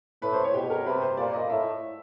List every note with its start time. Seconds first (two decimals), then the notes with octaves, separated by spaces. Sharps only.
0.22 A2 B4
0.33 C5
0.44 C#5
0.54 B2 G4
0.70 A#4
0.85 C3 B4
1.02 C5
1.17 A#2 D5
1.33 D#5
1.49 A2 E5